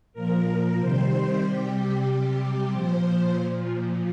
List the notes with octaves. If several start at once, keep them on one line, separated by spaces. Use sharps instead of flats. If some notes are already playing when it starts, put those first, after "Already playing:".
A#2 F3 A#4
C3 D#3 G3 C5
C3 G3 G4
C3 G3 G4
A#2 F3 C5
A#2 F3